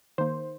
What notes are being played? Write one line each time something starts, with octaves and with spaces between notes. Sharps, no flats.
D#3 A#3 C5